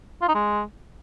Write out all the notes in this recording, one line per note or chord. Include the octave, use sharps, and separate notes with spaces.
F4
D#4
G#3